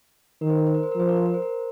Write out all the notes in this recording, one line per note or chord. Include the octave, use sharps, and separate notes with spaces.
D#3 A#4
C5
A#4
C5
A#4
C5
A#4
F3 C5
A#4
C5
A#4
C5
A#4